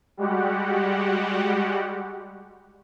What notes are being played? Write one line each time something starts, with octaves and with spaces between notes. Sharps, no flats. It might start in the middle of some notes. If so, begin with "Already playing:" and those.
G3 G#3 F#4 G4 F#5